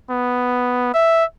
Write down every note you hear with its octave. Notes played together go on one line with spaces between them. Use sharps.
B3
E5